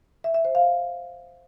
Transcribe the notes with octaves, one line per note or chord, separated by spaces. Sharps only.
E5
E5
C5
F5